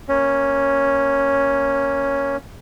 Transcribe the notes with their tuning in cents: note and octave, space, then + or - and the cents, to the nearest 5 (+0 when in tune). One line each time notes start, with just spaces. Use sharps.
A#3 +0 C#4 +0